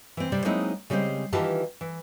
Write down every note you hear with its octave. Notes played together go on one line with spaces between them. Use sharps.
E3 C4
C3 G3 C5 D5
F#3 G#3 A#3 C4 D#4 E4
C#3 G3 G#3 C4 C5
D#3 E3 F4 G4 B4 A5
E3